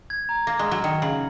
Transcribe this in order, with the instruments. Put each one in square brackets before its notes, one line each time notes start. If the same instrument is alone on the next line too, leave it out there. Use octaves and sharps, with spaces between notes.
[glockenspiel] G#6
A#5
[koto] A#3 [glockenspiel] A#6
[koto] G#3
[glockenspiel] F6
[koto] F#3
[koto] D#3 [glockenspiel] C#7
[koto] C#3 [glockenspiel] F#7